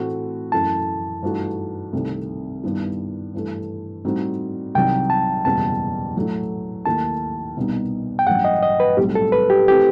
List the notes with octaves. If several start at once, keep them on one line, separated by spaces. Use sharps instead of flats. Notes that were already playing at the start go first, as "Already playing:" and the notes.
Already playing: A2 E3 A3 C4 F#4
F#2 E3 A3 A5
G2 E3 A3 D#4 F#4
C2 C3 D#3 A3 C4
G2 D#3 G3 B3 E4
G2 E3 A3
A2 G3 C4 D#4 F#4
C2 C3 D#3 F#3 G5
A5
F#1 E2 B2 G3 A5
A2 F#3 A3 E4
D#2 D#3 A3 E4 A5
C2 B2 G3 B3 D#4
G5
A1 G2 F#3 F#5
D#5
D#5
B4
B1 A2 G3 C4 G4
A4
B4
G4
E3 A3 C4 G4